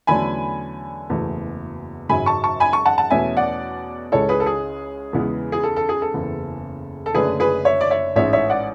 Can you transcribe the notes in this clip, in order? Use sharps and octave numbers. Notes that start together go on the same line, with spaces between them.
E2 D3 F#3 A3 C#4 G#5 B5
F#1 E2 B2 A3
G#1 F#2 C#3 F#3 G#5 B5
A5 C#6
A5 C#6
G#5 B5
A5 C#6
F#5 A5
F#5 A5
E2 B2 A3 C#4 E5 G#5
D5 F#5
C#2 C#3 G#3 C#4 E4 A4 C#5
G#4 B4
A4
G#4
E2 C#3 G#3 B3 E4
G#4
A4
A4
G#4
A4
F#1 E2 C#3
A4
F#1 F#2 D3 A3 C#4 G#4 B4
G#4 B4
C#5 E5
D5
C#5 E5
A1 G#2 G#3 C#4 E4 C#5 E5
C#5 E5
D5 F#5